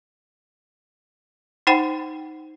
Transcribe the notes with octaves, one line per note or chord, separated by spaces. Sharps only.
D#4 C5 F#5 G5 B5